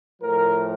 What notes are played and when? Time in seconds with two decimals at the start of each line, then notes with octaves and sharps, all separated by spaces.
0.22 A2 F3 A#4